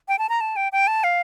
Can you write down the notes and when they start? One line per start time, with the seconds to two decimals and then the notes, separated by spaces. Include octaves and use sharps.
0.08 G5
0.19 A5
0.29 A#5
0.41 A5
0.56 G5
0.72 G5
0.87 A5
1.04 F5